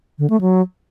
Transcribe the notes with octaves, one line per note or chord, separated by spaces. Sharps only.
D3
A3
F#3